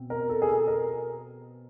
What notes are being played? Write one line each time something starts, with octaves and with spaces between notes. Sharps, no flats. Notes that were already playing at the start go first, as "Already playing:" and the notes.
Already playing: B2 C4
A#4
A4
G#4
A4
A#4